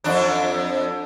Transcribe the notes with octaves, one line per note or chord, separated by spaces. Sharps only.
F2 D4